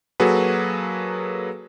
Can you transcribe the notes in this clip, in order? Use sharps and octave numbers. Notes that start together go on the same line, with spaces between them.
F#3 A#3 F#4 G#4 A4 B4